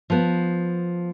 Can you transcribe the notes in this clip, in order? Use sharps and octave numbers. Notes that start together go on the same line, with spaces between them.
F3 B3